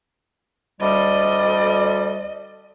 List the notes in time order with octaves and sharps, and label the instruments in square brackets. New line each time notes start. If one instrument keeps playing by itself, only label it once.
[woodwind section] D2 G3 D5 [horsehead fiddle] D#5